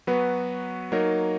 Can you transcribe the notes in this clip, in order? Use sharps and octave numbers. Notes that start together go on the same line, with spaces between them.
F#3 B3 F#4 B4
F#3 A#3 D#4 A#4 C#5